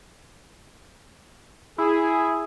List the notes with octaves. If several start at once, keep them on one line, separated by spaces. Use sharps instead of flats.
E4 G#4